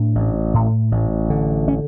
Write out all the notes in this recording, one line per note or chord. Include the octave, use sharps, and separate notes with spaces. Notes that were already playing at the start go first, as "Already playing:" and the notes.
Already playing: A2 D4
A1
A2
A1
D3
C#4